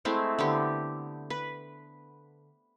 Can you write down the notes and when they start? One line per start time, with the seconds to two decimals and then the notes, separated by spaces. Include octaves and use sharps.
0.05 G#3 A3 C4 E4
0.39 D3 B3 C4 G4
1.30 B4